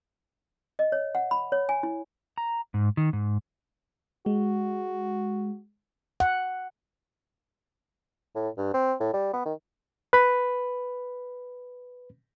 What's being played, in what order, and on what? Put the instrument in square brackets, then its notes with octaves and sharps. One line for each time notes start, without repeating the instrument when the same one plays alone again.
[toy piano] D#5
C#5
F#5
B5
C#5
G#5
E4
[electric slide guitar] A#5
G#2
D#3
G#2
[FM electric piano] G#3 [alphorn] F#4
[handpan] F#5
[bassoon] A2
G2
C4
A2
G3
B3
D#3
[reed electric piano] B4 B5